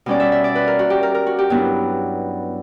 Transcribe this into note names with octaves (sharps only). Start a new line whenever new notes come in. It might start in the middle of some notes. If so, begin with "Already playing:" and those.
B2 G3 C#4 D5
E5
E5
D5
B4
A#4
F#4
G4
A#4
A#4
F#4
G4
G2 F#3 B3 E4